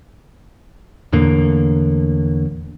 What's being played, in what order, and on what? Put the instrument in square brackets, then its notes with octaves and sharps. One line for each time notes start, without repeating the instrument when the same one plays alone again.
[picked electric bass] E2 A2 D3 A#3